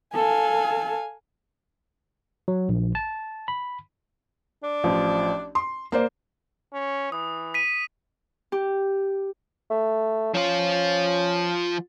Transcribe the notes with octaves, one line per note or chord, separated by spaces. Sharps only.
A4 F5 G#5
F#3
A#1
A5
B5
D4
A1 F3
C6
A#3 C5 D5
C#4
E3 D#6
B6 D#7
G4
A3
F3 C#4 F4